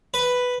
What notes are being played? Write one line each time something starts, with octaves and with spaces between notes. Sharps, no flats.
B4